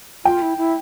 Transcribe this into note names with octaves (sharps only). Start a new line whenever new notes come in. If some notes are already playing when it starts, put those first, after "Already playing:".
F4 G5
E4
E4